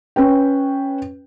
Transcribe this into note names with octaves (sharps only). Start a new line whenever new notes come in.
C#4 B4 G5